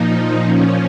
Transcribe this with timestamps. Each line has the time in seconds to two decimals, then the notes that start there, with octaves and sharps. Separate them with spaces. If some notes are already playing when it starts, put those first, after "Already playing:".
Already playing: A#2 F3 D#4
0.43 A#2 F3 C#4